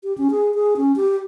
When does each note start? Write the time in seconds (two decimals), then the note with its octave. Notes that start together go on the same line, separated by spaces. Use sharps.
0.03 G4
0.18 C#4
0.31 G#4
0.54 G#4
0.77 C#4
0.96 G4